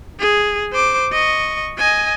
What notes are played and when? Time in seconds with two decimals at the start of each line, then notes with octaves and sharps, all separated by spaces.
0.20 G#4
0.73 C5 D6
1.12 D#5 C#6
1.78 D#5 G#5